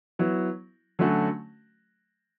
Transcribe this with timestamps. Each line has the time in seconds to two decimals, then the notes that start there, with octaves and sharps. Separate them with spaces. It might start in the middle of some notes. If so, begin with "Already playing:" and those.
0.19 F#3 B3 E4
0.99 D3 F#3 A3 C#4 F#4